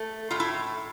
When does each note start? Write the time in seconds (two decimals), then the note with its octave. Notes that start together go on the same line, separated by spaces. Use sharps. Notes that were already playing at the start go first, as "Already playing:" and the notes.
Already playing: A3
0.31 A2 F4
0.40 E4